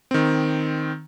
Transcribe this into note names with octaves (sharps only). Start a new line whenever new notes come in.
D#3 C4